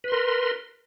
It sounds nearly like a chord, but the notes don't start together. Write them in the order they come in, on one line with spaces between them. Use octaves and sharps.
B4 C6 A#4